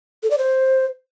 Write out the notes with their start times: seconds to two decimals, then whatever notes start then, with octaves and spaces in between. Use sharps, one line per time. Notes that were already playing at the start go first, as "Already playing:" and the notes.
0.23 A4
0.31 D5
0.38 C5